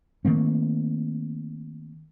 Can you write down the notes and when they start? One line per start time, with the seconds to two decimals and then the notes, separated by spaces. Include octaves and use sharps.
0.25 D#3 A3 A#3 C4